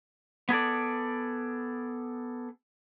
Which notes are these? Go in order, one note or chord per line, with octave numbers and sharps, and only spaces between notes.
B3 G#4 A4 D5